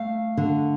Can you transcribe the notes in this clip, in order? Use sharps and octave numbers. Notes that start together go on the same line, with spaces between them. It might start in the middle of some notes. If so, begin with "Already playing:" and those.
Already playing: A3 F5
D3